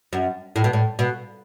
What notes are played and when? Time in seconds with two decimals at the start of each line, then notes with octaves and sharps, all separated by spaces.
0.13 F#2
0.56 A2
0.64 B2
0.73 A2
0.99 B2